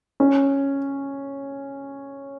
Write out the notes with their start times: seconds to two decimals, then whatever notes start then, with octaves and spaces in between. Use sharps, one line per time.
0.20 C#4